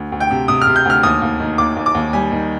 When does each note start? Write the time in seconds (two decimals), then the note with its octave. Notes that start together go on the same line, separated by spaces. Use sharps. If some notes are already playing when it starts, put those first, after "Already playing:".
Already playing: D2
0.12 D2
0.20 G5
0.31 C3
0.48 C3 D#6
0.62 F6
0.67 C3
0.76 G6
0.85 D2 F6
1.03 D#2 D#6
1.22 D#2
1.40 D#3
1.58 D#2 D6
1.77 D#2
1.86 D6
1.95 D#2
2.13 G3 G#5
2.32 D#3